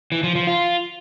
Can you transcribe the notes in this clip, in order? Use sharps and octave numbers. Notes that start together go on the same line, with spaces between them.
E3
F3
F3
F4